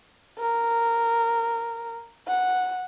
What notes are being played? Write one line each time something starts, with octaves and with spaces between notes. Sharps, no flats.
A#4
F#5